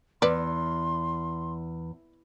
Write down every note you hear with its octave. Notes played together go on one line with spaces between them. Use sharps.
E2 B4 D5 C6